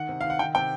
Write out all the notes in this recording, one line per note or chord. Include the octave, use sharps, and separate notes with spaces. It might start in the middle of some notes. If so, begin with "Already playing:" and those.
Already playing: D#3 F#5
C3
D#3 F5
F#5
D#3 G5
C3 G5